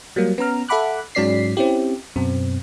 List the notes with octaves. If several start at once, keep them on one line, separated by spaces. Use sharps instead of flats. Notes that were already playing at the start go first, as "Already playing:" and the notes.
F#3 G3 A#3
B3 C#4 A#5 F6
A4 E5 F#5 B5 D6 F#6
G#2 F#3 C#4 D5 B6 C7
C4 C#4 E4 G4
F#2 B2 C4